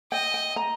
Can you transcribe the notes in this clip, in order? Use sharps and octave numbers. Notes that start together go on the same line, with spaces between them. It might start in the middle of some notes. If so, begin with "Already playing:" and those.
D#5 G5
G5
A#5